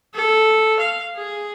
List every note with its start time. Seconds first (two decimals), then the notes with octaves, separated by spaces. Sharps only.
0.15 A4
0.80 F5
1.16 G#4